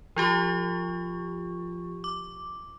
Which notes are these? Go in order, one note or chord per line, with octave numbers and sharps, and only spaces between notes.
F3 F4 G4 C#6
D6